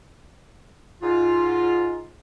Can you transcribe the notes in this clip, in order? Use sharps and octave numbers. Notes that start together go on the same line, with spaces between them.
G#2 F4